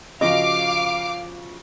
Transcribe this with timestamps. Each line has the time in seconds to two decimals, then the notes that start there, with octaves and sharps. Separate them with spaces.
0.21 C#3 F3 F#4 D#5 F5 D6